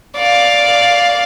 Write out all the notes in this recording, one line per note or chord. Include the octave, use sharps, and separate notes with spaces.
D5 F5